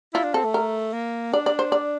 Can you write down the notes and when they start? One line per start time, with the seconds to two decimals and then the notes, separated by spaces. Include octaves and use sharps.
0.14 E4 F4
0.24 D4
0.34 C4 A4
0.44 A3
0.54 A#4
0.93 A#3
1.33 D4 D5
1.46 D5
1.59 C5
1.72 D5